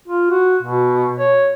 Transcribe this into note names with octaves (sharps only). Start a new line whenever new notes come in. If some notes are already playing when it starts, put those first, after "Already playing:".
F4
F#4
B2
C#5